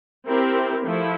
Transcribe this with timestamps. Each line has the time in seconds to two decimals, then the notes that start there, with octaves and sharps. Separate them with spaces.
0.27 C4 E4 G4 A#4
0.85 F3 A3 E4